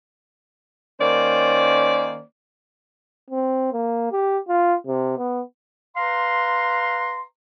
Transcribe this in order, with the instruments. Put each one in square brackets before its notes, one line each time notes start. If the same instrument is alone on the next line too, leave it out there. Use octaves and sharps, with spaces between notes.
[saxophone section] D#3 A#3 C#4 C5 D5
[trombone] C4
A#3
G4
F4
C3
B3
[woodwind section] B4 F5 A#5 C6